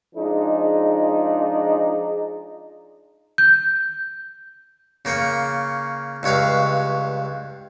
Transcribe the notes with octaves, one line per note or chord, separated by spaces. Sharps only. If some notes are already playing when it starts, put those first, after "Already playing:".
F3 G#3 D4 D#4
G6
C#3 A#3 G5 C#6
C#2 G2 C#5 E5 F5